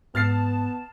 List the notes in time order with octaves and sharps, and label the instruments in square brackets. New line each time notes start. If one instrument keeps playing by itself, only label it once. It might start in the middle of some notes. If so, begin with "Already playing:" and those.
[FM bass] G#2 [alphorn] B3 [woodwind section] A5 [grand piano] F6 A6 C7